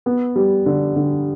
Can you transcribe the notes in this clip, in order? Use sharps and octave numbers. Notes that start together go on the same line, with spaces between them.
B3
G3
D3
D3